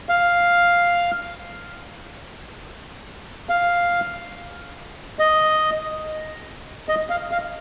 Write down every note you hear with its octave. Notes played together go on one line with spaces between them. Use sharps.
F5
F5
D#5
D#5
F5
F5